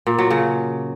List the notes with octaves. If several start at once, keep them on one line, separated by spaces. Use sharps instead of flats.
A#2
F#3
C#3